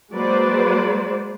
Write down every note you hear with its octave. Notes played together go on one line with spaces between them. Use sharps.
F#3 G#3 A#3 B4 C5 D5